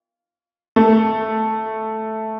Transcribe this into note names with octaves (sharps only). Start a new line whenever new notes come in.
A3